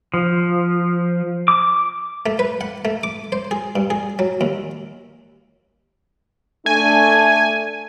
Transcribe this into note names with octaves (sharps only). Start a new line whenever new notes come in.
F3
D6
A3
B4
F#5
A3
D6
C5
G#4
G2
G#4
F#3
D#2
A3 D4 G#5